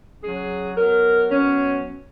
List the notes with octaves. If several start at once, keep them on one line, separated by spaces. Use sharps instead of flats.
C#3 F#3 G#4
B2 F#3 A#4
B2 F#3 C#4